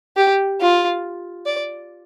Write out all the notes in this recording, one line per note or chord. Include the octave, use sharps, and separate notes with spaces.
G4
F4
D5